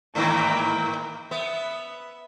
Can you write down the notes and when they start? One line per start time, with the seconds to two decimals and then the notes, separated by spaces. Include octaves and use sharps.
0.15 G#2 D#3 E3 A#3 G5
1.31 B3 E5